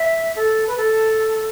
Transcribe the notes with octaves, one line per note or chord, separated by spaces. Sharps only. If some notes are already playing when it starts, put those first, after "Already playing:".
Already playing: E5
A4
B4
A4